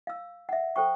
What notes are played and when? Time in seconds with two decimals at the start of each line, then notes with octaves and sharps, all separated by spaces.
0.07 F5 E6
0.49 E5 F#5
0.76 A4 C5 G5 C#6